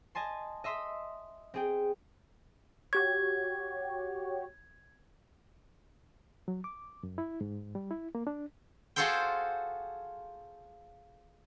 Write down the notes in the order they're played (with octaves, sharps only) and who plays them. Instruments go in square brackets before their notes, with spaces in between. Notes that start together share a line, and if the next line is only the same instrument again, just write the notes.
[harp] D#5 G#5 A5 C6
D#5 E5 C6 D#6 B6
C4 G#4 G5
[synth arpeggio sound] F#4 G4 C#5 [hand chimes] G#6
[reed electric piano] F#3
D6
F#2
E4
G#2
G3
E4
A#3
D4
[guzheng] F4 F#4 G#4 A4 C5 G5